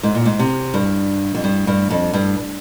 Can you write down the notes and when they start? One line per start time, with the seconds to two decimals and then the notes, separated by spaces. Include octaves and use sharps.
0.03 G#2
0.15 A#2
0.25 G#2
0.39 C3
0.74 G2
1.35 F2
1.44 G2
1.67 G2
1.90 F2
2.14 G2